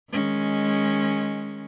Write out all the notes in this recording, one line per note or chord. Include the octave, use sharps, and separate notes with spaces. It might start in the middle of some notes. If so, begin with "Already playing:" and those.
D#3 G#3 C#4